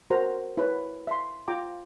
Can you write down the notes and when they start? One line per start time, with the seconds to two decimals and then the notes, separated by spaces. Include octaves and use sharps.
0.10 F#4 A#4 C5 A#5
0.57 E4 B4 C#5
1.07 E5 C6
1.48 F4 G5 A#5 D6